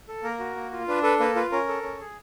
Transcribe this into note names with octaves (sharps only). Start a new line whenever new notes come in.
A4
A#3 A#4
F#4
A#3
F4
D4 B4
A4 B4
A#3 B4
F4 B4
C#4 A#4
A4
C#4
G#4